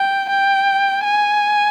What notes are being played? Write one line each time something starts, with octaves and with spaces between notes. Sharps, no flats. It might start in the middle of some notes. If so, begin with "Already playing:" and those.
Already playing: G5
G5
G#5